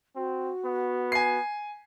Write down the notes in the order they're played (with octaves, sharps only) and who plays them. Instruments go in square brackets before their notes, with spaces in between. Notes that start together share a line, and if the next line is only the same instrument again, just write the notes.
[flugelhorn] C4 [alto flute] F#4
[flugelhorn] B3
[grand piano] G#5 C7